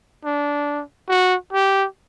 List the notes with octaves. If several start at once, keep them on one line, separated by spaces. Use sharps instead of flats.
D4
F#4
G4